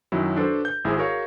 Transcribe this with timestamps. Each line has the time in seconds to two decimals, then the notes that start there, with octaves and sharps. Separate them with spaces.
0.12 F#2 D#3 F#3 E4
0.36 D4 F#4 A4 B4 C5
0.65 G6
0.84 G#1 E4 G#4 C5 G#5
0.97 F#4 G#4 A#4 C#5 F5